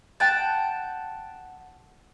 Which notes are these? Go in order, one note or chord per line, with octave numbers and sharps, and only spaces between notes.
F#5 G5 A5